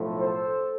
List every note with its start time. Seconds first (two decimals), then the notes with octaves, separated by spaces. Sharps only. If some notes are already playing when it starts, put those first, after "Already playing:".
Already playing: B1 A2 F3 A3
0.19 A4 C5